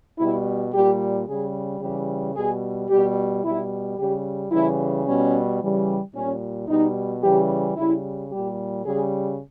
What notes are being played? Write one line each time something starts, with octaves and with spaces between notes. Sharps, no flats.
B2 G3 E4
A#2 G3 G4
C#3 G3 G#4
C#3 E3 G3 G4
B2 G3 G#4
B2 G3 G4
B2 G3 E4
C#3 G3 G4
C#3 E3 G3 E4
B2 G3 C#4
C#3 E3 G3
A#2 G3 C#4
B2 G3 D#4
C#3 E3 G3 G4
C#3 G3 E4
A#2 G3 G4
C#3 G3 G#4